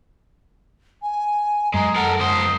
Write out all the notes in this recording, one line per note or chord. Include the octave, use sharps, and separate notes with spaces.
G#5
F#2 G#3 A#5
A4 A#4 F#5
C#2 C5 D#6